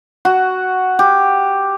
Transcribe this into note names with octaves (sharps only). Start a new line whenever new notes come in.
F#4
G4